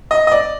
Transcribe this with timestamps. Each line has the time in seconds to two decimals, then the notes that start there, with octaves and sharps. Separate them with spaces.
0.11 D#5
0.27 D#5
0.32 D5